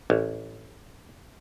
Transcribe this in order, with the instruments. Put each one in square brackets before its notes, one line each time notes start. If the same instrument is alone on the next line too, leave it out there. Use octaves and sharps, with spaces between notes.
[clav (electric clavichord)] A1